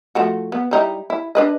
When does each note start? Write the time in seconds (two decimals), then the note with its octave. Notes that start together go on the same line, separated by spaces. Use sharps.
0.15 F3 A3 F#4
0.52 B3
0.71 G3 D#4 E4
1.10 E4
1.35 D4 B4 D#5